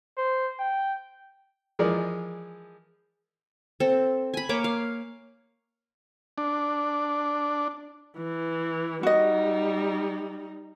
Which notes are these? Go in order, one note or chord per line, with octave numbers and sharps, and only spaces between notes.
C5
G5
E3 F3 G#3 G#4 A#4 D5
C4 A4
G#5 B5
A#3 C#5 D6
F5
D4
E3
G3 D#4 F#4 D#5